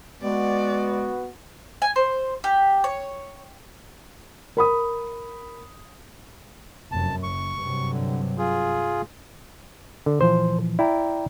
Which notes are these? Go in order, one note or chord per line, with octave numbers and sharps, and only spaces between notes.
G#3 B3 F#4 D5
G#5
C5
G4
C#5
A#4 B5 D#6
F1 F#2 A5
F#1 C#6
G2 C3 F#3
D3
F4 G#4
D3
A#2 E3 F3 C5
E4 D5 G5 A#5